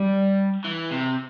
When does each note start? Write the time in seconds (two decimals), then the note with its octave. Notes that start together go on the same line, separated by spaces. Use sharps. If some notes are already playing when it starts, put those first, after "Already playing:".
Already playing: G3
0.64 E3
0.91 C3